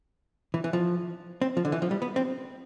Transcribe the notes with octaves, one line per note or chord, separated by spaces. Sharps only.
E3
E3
F3
C4
F3
D3
E3
F3
G3
B3
C4